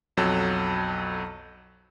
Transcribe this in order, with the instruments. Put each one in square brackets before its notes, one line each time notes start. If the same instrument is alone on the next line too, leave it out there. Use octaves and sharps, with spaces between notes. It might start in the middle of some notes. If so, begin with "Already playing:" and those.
[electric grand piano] B1 F2 F#3 A4